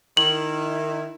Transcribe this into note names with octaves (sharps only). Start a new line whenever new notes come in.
D#3 E4 F#7